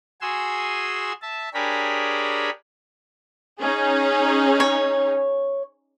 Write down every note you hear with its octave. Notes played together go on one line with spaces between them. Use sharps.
F#4 G#4 G#5 C6 E6
E5 A5
D4 G4 G#4 A#4 C#5 B5
C#4 D#4 G#4
C#5